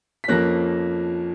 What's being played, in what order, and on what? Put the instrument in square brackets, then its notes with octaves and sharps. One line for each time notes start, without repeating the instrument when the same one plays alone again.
[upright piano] B6
F2 F3 A#3 C#4 F#6 A#6